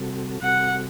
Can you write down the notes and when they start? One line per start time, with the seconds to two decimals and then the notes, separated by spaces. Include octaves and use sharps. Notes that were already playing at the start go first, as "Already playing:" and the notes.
Already playing: C3 G3 C4 F#4 A4
0.42 C3 G3 C4 F#4 A4 F#5